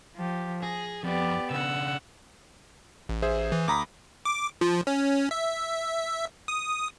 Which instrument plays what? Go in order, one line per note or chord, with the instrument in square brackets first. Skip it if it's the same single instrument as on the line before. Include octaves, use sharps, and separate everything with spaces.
[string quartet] F3 G4
[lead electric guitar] G#4 [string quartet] A#6
[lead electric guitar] F2 [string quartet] B3 G4 D5
[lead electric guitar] C#3 D4 [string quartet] F#5 E6
[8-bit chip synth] A1
[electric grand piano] G#4 C5 E5
[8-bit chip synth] E3
[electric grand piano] D2 A#5 B5 [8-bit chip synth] D6 D#6
[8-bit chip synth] D6
F3
C#4
E5
D#6